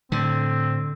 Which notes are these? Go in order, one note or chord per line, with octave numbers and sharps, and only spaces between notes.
A2 D3 C4